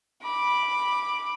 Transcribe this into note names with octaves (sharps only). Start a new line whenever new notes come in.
B5 D6